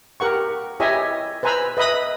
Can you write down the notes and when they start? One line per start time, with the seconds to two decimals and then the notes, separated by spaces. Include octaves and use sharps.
0.20 G4 A#4 F#5 C#6
0.80 E4 G4 C#5 D#5 E5 G#5
1.43 B4 C5 G#5 A#5 B5 E6
1.77 B4 D#5 E5 B5 D#6